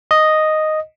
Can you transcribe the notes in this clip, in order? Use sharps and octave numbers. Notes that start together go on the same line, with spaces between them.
D#5